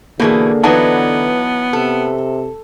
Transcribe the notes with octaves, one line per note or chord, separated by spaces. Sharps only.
B2 D3 E3 A3 A#3 G#4 A4
E3 F#3 B3 D#4 B4 A5
C3 A4